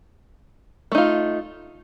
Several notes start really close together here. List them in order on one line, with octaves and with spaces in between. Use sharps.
A3 D#4 F4